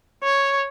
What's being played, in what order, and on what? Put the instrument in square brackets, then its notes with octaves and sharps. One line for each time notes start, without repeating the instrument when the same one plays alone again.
[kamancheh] C#5